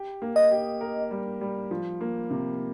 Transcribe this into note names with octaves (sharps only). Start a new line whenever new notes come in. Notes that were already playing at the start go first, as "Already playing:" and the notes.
Already playing: G4
A#3
D#5
G4
A#4
G3
G3
F3
A#3
C3